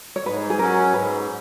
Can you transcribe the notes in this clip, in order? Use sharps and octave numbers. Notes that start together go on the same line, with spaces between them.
C#5
G#2 B4
G#4
F#3 C#4 A#4
G#2 B4